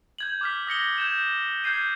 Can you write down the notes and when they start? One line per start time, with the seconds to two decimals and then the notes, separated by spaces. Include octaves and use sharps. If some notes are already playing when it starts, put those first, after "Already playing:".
0.18 G6 G#6 F#7
0.41 D6 F6 B6
0.67 D#6 A#6 C#7 G7
0.98 G6 G#6 E7
1.64 F6 G6 G#6 C7 D#7